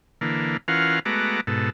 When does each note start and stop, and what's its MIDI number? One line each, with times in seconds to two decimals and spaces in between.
0.21 0.57 50
0.21 0.57 52
0.21 0.57 58
0.68 0.99 52
0.68 0.99 61
0.68 0.99 65
0.68 0.99 70
0.68 0.99 77
0.68 0.99 78
1.05 1.41 56
1.05 1.41 57
1.05 1.41 59
1.05 1.41 66
1.05 1.41 82
1.05 1.41 86
1.47 1.70 44
1.47 1.70 47
1.47 1.70 69